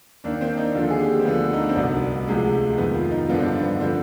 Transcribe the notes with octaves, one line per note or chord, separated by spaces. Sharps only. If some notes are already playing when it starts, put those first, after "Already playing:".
D#2 D#3 D4
C4
D4
D#4
D#2 D3 F3 F4
G#4
G4
C4
D2 D3 F3 B3
D#4
D4
C4
C2 B2 B3
D2 C3 F3 G#3
F2 D#3 B3
F4
D#4
G2 D3 F3 B3
C4
D4
B3
D3 F3 C4